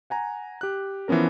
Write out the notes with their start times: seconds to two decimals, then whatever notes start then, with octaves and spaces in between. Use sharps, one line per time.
0.10 F#5 G#5 A#5
0.61 G4 F#6
1.08 E3 F3 B3 C#4 A#4